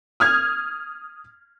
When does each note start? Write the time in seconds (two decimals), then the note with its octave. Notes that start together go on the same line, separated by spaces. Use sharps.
0.20 D#6 F6 G#6